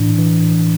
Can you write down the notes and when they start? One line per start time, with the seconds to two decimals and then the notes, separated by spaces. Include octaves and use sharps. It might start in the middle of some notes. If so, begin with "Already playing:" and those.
Already playing: A2 E3 D4
0.18 E3